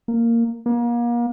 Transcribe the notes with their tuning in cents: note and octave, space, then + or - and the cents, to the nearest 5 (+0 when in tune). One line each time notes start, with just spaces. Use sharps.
A#3 -10
A#3 +35